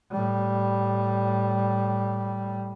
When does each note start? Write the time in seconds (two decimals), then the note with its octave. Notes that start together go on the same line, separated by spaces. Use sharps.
0.11 A2 G3